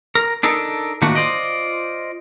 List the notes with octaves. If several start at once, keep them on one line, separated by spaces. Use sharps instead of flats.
A#4
D4 D#4 A4 A#4
A2 D#3 A3 A#3 D4 F#4
F4 C5 D5 D#5